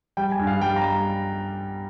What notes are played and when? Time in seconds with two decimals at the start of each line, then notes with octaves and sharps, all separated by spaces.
0.17 G3 G5
0.32 G#5
0.39 G2
0.47 F5
0.61 G3 G5
0.76 A#5